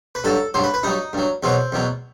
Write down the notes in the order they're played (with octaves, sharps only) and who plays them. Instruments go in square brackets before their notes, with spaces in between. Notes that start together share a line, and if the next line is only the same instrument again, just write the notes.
[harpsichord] B4
G2 F#3 A4
G2 F#3 C5
B4
B4
G2 F#3 D#4
G2 F#3
E2 B2 F#3 C4
E2 B2 F#3